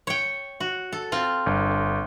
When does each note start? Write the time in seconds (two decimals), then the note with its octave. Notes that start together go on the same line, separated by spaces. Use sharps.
0.07 C#5 G5
0.60 F#4
0.93 A4
1.12 C4 F4
1.46 G1